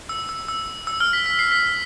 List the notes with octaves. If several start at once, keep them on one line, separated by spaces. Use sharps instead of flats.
E6
E6
E6
E6
F6
B6
B6
C7
B6